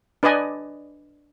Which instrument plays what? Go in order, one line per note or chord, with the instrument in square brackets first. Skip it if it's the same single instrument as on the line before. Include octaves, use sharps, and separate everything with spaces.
[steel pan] D4 B4 D5 D#5 G#5